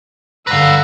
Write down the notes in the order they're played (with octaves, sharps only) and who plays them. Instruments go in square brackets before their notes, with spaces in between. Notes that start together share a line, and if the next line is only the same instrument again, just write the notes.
[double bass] G2 D3 [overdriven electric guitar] B4 F5 [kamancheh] F#5 E6 [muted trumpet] A#5